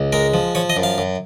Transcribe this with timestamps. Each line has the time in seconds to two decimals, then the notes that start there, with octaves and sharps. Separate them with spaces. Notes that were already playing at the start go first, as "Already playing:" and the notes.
Already playing: C#2
0.13 G#3 A#4
0.34 F3
0.55 F3 C#5
0.70 D#5
0.77 F#2
0.83 F5
0.98 F#2